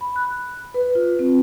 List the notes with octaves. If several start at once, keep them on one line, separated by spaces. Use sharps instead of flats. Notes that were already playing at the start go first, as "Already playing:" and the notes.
B5
F#6
B4
F4
C4